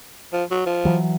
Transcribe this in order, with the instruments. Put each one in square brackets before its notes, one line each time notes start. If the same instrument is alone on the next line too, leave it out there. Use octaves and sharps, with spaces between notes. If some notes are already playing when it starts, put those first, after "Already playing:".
[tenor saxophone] F3
F#3
F3
[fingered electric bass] E3 F#3